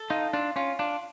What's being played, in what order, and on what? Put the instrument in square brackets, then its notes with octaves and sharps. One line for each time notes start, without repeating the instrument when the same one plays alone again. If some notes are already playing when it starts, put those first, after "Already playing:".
Already playing: [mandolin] A4
[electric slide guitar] D#4 [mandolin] F4
[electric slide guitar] D4 [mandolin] F4
[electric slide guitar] C#4 [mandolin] F4
[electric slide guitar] D4 [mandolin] F4